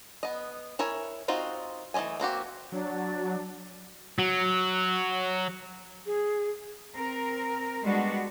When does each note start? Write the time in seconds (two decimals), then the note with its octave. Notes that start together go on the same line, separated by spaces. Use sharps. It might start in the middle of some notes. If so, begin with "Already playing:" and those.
0.23 B3 D#5
0.79 E4 A#4 C#5 G#5
1.28 C4 D#4 F4 F#4
1.94 E3 A3 C#5 D#5 G#5
2.20 A#3 C4 F#4 G4
2.72 F#3 D4
4.19 F#3
6.06 G#4
6.92 C4 A#4
7.83 G3 G#3 B3 D4 F#4